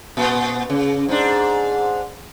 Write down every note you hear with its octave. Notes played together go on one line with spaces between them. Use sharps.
A#2 B3
C#3
G#2 D4